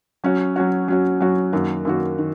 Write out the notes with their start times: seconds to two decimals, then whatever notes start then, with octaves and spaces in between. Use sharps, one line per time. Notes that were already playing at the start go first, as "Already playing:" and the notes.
0.24 F#3 C#4 F#4
0.56 F#3 C#4 F#4
0.88 F#3 C#4 F#4
1.21 F#3 C#4 F#4
1.53 F#2 D#3 A#3 F#4
1.85 F#2 D#3 A#3 F#4
2.18 D#3